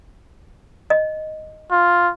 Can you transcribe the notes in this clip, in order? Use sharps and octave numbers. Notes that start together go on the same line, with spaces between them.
D#5
F4